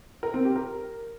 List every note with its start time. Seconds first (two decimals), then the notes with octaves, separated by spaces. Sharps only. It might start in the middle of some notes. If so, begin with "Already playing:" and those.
0.23 A#4
0.34 C4
0.45 G4
0.56 A#4